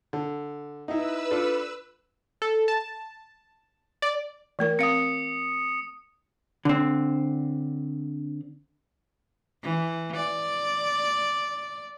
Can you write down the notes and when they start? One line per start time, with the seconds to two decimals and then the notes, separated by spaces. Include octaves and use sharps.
0.13 D3
0.88 D#4 E4 B4 E6
1.31 D4 F4 A4
2.42 A4
2.68 A5
4.02 D5
4.59 E3 A3 A#4
4.79 C4 F5 D#6 C#7
6.65 D3 C4
9.63 E3
10.16 D5